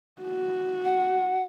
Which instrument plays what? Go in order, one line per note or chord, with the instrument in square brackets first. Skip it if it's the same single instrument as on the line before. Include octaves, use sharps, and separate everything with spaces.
[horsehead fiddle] F#4
[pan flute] F#5